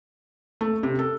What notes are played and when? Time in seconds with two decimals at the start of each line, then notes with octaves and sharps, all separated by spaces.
0.61 A3
0.83 C3
0.99 A4